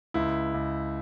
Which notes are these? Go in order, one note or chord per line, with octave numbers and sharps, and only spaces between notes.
C#2 E4
C#2